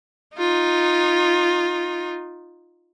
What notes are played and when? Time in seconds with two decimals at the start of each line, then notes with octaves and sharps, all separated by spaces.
0.36 D#4 F4